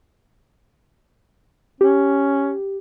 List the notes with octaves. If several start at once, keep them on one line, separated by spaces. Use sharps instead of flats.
C#4 G4